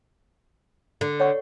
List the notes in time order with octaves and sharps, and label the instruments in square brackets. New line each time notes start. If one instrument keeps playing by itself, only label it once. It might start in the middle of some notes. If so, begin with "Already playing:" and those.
[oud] D3
[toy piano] C#5 F#5 C#6